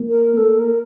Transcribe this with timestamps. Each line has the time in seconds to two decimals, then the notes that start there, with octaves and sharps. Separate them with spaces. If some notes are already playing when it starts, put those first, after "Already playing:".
Already playing: A#3
0.08 A#4
0.36 A#3 A4
0.58 A#4